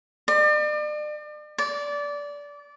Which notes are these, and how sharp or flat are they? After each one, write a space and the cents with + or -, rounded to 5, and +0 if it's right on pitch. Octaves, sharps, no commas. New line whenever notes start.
D5 +40
D5 -20